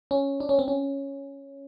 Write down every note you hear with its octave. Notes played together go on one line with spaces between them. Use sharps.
C#4
D4
C#4
C4
C#4